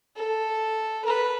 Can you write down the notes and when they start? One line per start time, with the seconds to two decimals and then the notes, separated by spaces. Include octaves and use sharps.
0.16 A4
1.05 B4